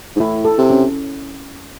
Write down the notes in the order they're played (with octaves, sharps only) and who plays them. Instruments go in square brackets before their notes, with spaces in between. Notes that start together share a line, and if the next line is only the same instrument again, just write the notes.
[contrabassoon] G#2
[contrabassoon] A2 [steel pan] E4
[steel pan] A4
[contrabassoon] C3
[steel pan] C#4